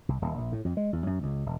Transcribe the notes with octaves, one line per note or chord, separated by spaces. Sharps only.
C2
D#1
A#1
A2
F2
G#3
E2
F#2
C#2
E1